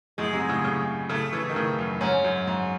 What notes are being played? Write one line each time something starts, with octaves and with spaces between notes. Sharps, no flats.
F#2 A2 G#3
G#2 C3
A2 C#3
A2 C#3
A2 C#3 A3
C#3 E3
D#3
A2 C#3
F#2
G#2 C#4
F#2
G#2